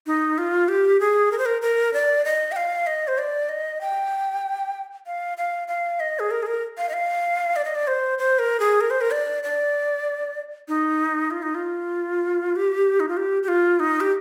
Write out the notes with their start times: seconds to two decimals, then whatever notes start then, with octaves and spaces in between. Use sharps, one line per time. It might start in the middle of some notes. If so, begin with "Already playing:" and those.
0.07 D#4
0.38 F4
0.68 G4
1.00 G#4
1.32 A#4
1.38 C5
1.46 A#4
1.62 A#4
1.93 D5
2.25 D#5
2.52 G5
2.56 F5
2.87 D#5
3.08 C5
3.18 D5
3.49 D#5
3.81 G5
5.06 F5
5.38 F5
5.68 F5
6.00 D#5
6.19 G#4
6.31 A#4
6.43 G#4
6.47 A#4
6.78 F5
6.89 D#5
6.93 F5
7.56 D5
7.65 D#5
7.75 D5
7.87 C5
8.19 C5
8.39 A#4
8.60 G#4
8.81 A#4
8.90 C5
9.01 A#4
9.11 D5
9.44 D5
10.68 D#4
11.31 F4
11.42 D#4
11.55 F4
12.56 G4
13.00 D#4
13.09 F4
13.17 G4
13.43 G4
13.48 F4
13.80 D#4
14.00 G4